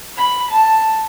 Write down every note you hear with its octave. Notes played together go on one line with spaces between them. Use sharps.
B5
A5